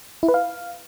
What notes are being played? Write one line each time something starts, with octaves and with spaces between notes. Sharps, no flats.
E4
B4
F5